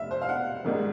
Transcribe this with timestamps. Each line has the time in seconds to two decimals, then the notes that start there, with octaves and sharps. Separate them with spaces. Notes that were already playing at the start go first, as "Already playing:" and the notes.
Already playing: F1 E5
0.11 C5
0.22 F5
0.29 F#5
0.65 G#1 G#2 D#3 G3